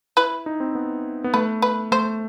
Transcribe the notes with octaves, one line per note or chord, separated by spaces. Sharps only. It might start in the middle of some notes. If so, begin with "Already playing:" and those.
E4 B4
D#4
C4
B3
B3
A3 B4
B4
A3 C5